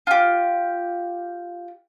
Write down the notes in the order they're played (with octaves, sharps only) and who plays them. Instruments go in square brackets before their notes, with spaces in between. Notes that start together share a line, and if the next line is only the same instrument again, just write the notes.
[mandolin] F4 G4